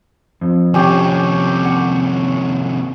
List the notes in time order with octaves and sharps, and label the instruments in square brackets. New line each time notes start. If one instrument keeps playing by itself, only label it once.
[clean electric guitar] F2
[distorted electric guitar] D#2 C3 [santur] C#4 G4
[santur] F#5